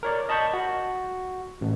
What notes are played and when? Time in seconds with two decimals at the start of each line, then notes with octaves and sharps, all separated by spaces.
0.03 A#4 C#5 D5
0.29 D#5 A5 B5 C#6 G6
0.53 F#4
1.61 A1